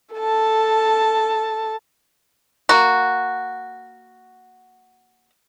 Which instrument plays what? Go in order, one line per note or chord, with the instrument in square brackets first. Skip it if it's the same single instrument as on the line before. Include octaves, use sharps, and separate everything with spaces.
[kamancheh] A4 A5
[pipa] A#3 F#4